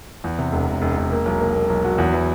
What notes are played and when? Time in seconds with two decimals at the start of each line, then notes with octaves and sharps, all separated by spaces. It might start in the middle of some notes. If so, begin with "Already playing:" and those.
0.24 E2
0.39 C3
0.52 E1
0.67 E1
0.81 E1
0.97 E1
1.11 A#3
1.26 B1
1.40 A#3
1.55 A#3
1.70 B1
1.84 F#3
1.98 E2
2.13 E3